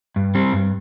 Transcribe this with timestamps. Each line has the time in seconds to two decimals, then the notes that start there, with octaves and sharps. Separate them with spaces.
0.16 G2
0.35 G3 C4
0.53 G2